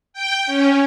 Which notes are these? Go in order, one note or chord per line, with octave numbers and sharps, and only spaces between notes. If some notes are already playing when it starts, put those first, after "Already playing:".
G5
C#4